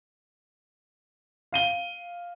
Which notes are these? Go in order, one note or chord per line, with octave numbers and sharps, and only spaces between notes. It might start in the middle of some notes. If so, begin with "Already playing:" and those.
F5 D#7 G7